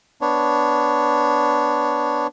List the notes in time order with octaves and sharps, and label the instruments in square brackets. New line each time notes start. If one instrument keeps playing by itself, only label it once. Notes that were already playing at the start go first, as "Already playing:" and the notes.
[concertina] B3 D4 C#5